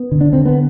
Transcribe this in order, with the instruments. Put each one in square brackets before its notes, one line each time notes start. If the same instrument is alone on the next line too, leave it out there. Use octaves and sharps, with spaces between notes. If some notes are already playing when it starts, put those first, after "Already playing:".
Already playing: [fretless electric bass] B3
D3
D4
D3 C4
B3